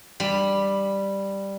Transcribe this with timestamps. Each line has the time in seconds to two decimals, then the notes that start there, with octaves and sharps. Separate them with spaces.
0.20 G3 B5